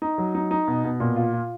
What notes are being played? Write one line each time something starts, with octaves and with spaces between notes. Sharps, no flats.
D#4
F#3
D#4
D#4
B2
B2
A#2
F4
F4